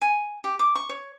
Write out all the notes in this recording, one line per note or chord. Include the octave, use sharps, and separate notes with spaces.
G#5
G4
D6
C#6
C#5